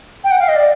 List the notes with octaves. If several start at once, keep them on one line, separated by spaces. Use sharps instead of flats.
G5
F#5
F5
D#5
D5